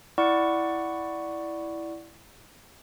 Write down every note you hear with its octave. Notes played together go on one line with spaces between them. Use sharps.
E4 D5 F#5 C#6